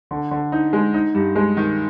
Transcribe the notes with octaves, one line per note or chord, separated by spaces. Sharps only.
D3
D3
D#4
G#3
D#4
G2
G#3
D#3